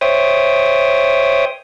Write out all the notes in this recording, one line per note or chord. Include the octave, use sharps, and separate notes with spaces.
C5 C#5 E5 G5 D#6